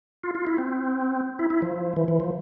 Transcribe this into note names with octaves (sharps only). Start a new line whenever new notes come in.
F4
F4
E4
C4
E4
E4
F3
E3
E3
F3